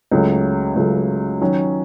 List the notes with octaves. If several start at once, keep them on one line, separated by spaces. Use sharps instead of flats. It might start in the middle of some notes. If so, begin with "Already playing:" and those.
C#2 C#3 F#3 A3
C#2 C#3 F#3 A3
D#3 F#3 C#4